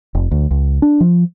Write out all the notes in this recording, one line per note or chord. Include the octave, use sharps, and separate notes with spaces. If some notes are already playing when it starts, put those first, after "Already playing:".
F1
D2
C#2
D4
F3